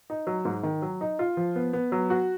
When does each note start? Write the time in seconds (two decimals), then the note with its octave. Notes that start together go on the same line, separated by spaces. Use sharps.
0.10 D#4
0.27 F#3
0.45 G#2
0.63 D#3
0.82 F#3
1.01 D#4
1.19 F4
1.37 F3
1.56 B3
1.73 B3
1.92 F#3
2.10 F#4